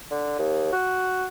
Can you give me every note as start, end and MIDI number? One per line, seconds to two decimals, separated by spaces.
0.11 0.34 50
0.39 0.70 39
0.73 1.27 66